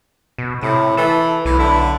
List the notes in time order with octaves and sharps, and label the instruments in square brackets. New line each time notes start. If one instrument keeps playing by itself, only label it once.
[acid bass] B2
[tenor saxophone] A2 [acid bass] C3
[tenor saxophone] E3 [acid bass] A4
[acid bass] B1 [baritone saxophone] E3
[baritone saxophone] D3 [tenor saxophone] E4